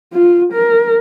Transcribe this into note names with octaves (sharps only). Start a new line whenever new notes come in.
F4
A#4